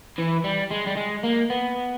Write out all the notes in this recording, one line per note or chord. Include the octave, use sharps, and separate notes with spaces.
E3
G3
G#3
G3
G#3
A#3
B3